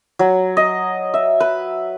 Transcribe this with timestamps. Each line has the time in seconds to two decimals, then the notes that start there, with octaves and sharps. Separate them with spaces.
0.19 F#3
0.57 D#5
1.14 E5
1.40 B4